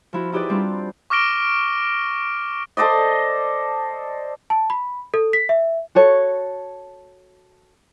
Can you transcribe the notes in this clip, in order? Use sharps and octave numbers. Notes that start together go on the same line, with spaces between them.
F3 E4 F#4
D#4 E4 G4 G#4 B4 D5
G3 C4 D4 F4
C#6 D6 F6 A#6 D7 G7
A4 C5 D5 D#5
A5
B5
A4
B6
E5
F#4 A4 C#5